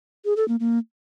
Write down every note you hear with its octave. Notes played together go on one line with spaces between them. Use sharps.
G#4
A4
A#3
A#3